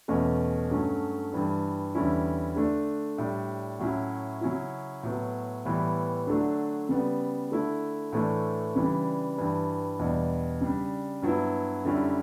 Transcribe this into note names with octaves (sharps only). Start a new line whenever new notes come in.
E2 B2 A3 C#4
G2 F#3 A3 C#4
G2 E3 G3
E2 D3 G3 C#4 E4
D3 A3 D4
A2 G3 D4
A2 F#3 C#4 E4
C#3 F#3 C#4 E4
A2 F#3 B3
A2 E3 G3 B3
D3 F#3 A3 D4
C#3 G3 B3
D3 A3 E4
A2 E3 A3 D4
C#3 E3 G3 D4
G2 E3 G3
E2 B2 G3 D4
C#3 G3 D4
G2 F#3 B3 E4
F#2 D3 G3 C#4 E4